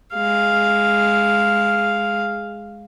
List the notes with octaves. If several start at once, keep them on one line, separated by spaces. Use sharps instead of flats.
G#3 F5